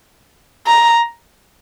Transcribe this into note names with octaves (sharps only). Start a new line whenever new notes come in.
A#5